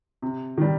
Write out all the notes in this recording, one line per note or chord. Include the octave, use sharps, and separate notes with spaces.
C3
D#3 G3